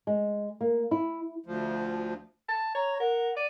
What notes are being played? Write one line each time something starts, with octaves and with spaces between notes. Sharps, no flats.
G#3
A#3
E4
D2 F3
A5
C#5 A#5
A#4 F#5
D5 D#7